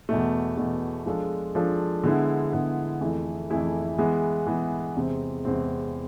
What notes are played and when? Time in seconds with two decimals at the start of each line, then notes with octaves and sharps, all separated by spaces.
0.09 E2 B2 A3
0.58 E2 B2 A3
1.06 F3 G#3 D4 F4 A4
1.55 F3 G#3 D4 F4 A4
2.04 D3 G#3 B3 E4
2.52 D3 G#3 B3 E4
3.01 F2 E3 A3 E4 G#4
3.50 F2 E3 A3 E4 G#4
3.98 E3 G#3 B3
4.47 E3 G#3 B3
4.96 E2 C3 G#3 C4
5.45 E2 C3 G#3 C4